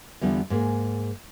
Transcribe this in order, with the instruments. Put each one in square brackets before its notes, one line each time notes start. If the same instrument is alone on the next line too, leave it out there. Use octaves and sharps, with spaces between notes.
[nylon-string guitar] E2 D3 G3 B3 F4
G#2 A#3 G#4